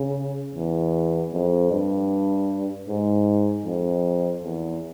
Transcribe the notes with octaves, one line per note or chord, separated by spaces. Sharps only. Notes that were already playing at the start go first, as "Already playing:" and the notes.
Already playing: C#3
E2
F2
G2
G#2
F2
E2